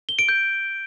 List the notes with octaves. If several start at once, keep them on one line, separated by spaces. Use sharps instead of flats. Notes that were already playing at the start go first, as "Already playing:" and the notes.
G7
D7
G6